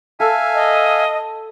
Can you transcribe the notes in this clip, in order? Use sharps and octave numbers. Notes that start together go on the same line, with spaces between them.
A4 E5 F5 G#5
D#5